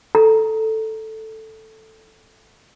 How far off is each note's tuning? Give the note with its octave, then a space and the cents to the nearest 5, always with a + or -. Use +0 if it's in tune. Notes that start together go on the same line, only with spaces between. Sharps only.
A4 +0 A#5 +0